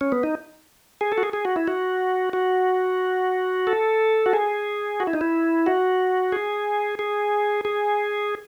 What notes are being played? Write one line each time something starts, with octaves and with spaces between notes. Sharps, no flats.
C#4
B3
D#4
G#4
A4
F#4
G#4
G#4
F#4
E4
F#4
F#4
A4
F#4
G#4
F#4
E4
D#4
E4
F#4
G#4
G#4
G#4